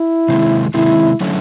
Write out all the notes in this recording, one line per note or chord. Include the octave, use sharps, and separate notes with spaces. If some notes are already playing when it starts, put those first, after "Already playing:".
Already playing: E4
C3 D#3 G#3 C4
C3 D#3 G#3 C4 E4
D3 F#3 A3 C#4 E4